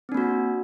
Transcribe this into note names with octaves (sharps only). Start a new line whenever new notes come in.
A#3 C4 D4 F#4